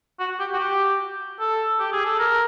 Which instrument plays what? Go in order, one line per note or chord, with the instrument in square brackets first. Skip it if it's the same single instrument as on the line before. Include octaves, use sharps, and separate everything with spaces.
[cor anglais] F#4
G4
F#4
G4
A4
G4
G#4
A4
A#4